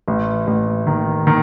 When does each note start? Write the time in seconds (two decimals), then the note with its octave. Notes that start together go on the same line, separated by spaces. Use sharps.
0.08 A1
0.47 A1
0.87 D#3
1.27 D#3